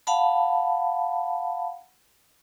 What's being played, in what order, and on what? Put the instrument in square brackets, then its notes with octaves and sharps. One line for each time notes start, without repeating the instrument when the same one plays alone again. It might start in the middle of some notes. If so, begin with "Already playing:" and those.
[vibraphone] F5 F#5 A5 B5